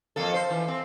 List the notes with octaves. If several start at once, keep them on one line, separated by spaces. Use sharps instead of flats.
F2 A#3 A4
C5
E3
C4